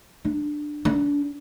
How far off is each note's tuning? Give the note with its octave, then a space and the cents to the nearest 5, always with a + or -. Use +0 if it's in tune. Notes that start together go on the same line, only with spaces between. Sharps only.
D4 +15
D4 -30